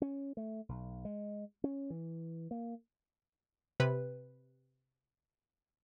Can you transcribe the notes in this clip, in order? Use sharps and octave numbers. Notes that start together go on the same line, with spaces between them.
C#4
A3
B1
G#3
C#4
E3
A#3
C3 B4